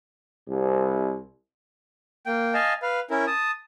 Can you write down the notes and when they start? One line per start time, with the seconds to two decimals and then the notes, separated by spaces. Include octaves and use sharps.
0.49 C2
2.26 A#3 G5
2.54 D#5 F5 G#5 A5
2.82 B4 F5
3.10 C#4 E4 A#4
3.27 A5 D#6